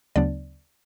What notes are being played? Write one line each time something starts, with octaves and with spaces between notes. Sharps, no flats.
D2 C#3 F#3 B3 D4 D5